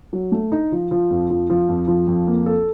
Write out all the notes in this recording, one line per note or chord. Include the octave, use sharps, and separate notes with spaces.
F#3
A3
D#4
F3
F3
F2
F3
F3
F2
F3
F2
A#3
A4